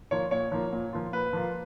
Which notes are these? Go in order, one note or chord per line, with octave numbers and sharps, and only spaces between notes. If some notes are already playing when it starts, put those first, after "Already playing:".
F3 A#3 F4 C#5
A#2 C#5
F3 A#3 F4
A#2
F3 A#3 F4
A#2 B4
F3 A#3 F4